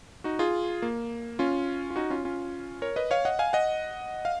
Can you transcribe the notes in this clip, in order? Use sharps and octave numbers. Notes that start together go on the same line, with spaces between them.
D#4 F#4
F4 G#4
A#3
C#4 F4
F4
D#4 F#4
C#4 F4
C#4 F4
A#4 C#5
B4 D#5
C#5 F5
D#5 F#5
F5 G#5
D#5 F#5
F5